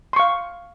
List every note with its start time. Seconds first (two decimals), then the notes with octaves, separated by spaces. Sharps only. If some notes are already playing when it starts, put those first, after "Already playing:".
0.13 C6
0.16 C#6
0.19 F5